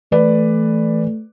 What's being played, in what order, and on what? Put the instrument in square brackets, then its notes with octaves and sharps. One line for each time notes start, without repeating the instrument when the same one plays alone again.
[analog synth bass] E3 [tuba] A3 [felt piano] B4 D5